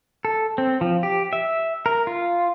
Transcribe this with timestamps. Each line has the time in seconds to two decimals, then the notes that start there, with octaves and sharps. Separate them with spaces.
0.25 A4
0.58 C4
0.81 F3
1.03 G4
1.33 E5
1.86 A#4
2.07 F4